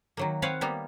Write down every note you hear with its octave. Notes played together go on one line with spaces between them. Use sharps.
D#3 F#3 A#3
C4 B4 C#5 F5 F#5
G3 A#3 B3